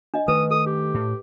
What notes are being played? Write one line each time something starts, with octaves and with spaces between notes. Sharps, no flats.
D4 D#5
D#3 A3 B4 D#6
A4 D#6
G4
A2